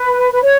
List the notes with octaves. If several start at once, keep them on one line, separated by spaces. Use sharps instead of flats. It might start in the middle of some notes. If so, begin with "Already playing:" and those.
Already playing: B4
B4
C#5